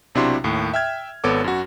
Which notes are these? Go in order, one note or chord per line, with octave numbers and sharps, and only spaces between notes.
B1 C3 D4 E4 F#4 C6
D#2 A2
E5 G5 F6 G#6
G#1 B3 A4 C#5 D6
F#2 F#4